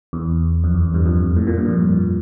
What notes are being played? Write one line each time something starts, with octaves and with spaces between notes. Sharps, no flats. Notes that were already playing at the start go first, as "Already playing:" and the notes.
E2
F2
E2
G2
F2
A2
A#2
G2
F2